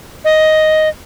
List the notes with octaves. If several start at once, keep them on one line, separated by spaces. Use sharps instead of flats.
D#5